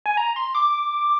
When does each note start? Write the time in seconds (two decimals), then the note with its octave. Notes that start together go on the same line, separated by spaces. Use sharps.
0.06 G#5
0.17 A#5
0.36 C6
0.55 D6